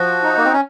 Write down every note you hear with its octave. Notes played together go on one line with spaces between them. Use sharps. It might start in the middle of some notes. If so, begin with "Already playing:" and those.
Already playing: F3 F#4
D#4
A#3
C4
C#4